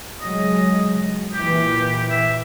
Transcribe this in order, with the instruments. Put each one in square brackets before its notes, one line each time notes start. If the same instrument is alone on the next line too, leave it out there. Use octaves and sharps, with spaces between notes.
[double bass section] C#3 F#3 G#3 [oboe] D#5
[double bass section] A#2 E3 [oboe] G4
[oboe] E5